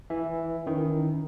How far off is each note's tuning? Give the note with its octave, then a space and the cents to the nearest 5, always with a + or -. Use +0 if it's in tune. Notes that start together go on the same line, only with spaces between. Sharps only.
E3 +0 E5 +0
D#3 +0 C#4 +25 E4 +0